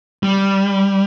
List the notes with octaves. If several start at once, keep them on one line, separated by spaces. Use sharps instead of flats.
G3